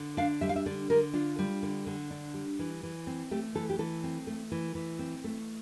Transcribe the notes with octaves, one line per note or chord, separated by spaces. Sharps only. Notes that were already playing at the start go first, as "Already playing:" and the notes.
Already playing: D3
D4 F5
G3 E5
F5
E5
D3 D5
D3 A#4
D4 F4
G3
D3
D3
D4
G3
E3
E3
C4
A3 G4
E3 A4
G4
E3 A4
C4
A3
E3
E3
C4
A3